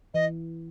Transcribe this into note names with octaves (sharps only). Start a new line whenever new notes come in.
E3 D#5